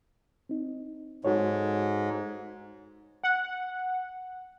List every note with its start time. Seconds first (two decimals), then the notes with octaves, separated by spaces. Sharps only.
0.49 C4 D#4
1.25 G#2 F#4 A4 C#5
3.23 F#5